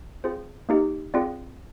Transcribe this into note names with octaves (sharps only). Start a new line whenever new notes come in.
C4 F4 G#4 C5
A#3 D#4 G4
C4 F4 G#4 D5